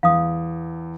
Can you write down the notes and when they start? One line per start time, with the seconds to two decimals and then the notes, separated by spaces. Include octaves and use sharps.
0.03 E2 F5 D#6